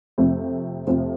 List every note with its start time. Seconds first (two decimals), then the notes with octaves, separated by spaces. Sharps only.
0.18 F2 C3 F3 A3 C4
0.87 F2 C3 F3 A3 C4